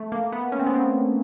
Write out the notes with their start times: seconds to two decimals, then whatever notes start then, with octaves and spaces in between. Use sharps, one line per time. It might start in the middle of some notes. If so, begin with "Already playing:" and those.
Already playing: A3
0.12 A#3
0.32 B3
0.52 C#4
0.59 C4
0.67 B3
0.75 C4